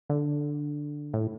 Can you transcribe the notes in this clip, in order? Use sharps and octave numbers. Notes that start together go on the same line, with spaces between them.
D3
A2